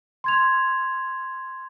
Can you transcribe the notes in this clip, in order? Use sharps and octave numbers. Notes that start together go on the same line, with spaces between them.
C6 G#6 F7